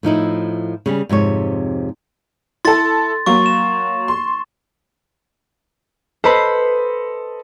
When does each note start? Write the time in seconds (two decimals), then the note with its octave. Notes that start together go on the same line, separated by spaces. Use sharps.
0.03 A2 F3 D#4 E4
0.86 C#3 G3 C#4
1.09 F2 G#2 C3 C#5
2.65 E4 A4 C6 A6
3.26 F#3 A#3 C#6
3.46 E7
4.08 C6
6.24 A4 B4 C5 D#5 B5